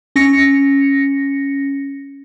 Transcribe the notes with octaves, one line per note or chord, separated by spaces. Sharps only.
C#4 A#6 C#7